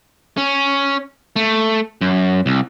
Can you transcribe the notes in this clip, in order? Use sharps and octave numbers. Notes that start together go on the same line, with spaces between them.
C#4
A3
F#2
C2